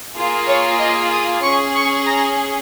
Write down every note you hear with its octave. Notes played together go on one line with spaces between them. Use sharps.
A#3 F4 G#4
C#5
D#5
D#6
C#4 G#4 C#6
C#6
A#5